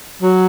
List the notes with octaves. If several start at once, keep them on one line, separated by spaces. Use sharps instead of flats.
F#3